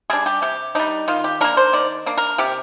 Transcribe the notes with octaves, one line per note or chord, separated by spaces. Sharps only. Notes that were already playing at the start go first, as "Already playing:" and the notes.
G3 D4 G#4
G4
C3 G4
G3 D4 D#4
D#3 F4
G4
A#3 D4 A#4
C5
D#3 D5
A#3 D4
A#4
C3 G4